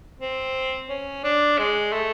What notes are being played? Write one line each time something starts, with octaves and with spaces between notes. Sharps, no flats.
C4
C#4
D4
G#3
A3